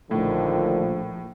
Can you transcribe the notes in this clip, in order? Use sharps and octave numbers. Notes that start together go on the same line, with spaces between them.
A#1 A2 D3 D#3 F3